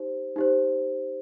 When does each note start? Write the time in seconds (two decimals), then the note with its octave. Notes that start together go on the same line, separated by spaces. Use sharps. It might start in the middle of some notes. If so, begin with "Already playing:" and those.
Already playing: D#4 G4 C5
0.36 D#4 G4 C5